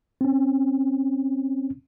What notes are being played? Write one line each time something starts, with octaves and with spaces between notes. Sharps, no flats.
C4 C#4